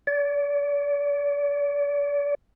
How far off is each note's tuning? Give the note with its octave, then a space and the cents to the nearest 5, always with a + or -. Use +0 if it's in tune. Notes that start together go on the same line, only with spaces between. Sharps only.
D5 -40